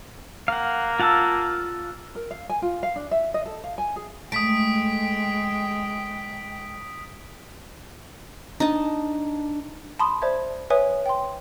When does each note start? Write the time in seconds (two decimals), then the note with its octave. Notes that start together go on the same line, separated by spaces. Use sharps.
0.48 A#3 F5 F#5
1.00 F4 F#5 A5 E6 A6
2.15 A#4
2.31 F5
2.50 G#5
2.62 F4
2.83 F5
2.96 D4
3.11 E5
3.34 D#5
3.46 A4
3.64 F5
3.78 G#5
3.96 G#4
4.32 G#3 A3 G5 D#6 B6 D7
8.60 D4 D#4 A5
9.99 A5 B5 C6 D#6
10.22 C5 D5 E5 A5 G#6
10.70 B4 C#5 E5 G#5 D#6
11.06 G5 C6